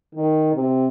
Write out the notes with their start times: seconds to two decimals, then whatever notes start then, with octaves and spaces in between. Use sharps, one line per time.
0.15 D#3
0.54 C3